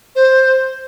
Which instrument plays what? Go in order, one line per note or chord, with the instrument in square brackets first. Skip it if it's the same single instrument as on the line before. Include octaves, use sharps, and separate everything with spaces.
[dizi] C5